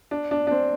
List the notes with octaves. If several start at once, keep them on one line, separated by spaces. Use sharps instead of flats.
D4
D4
D4
C4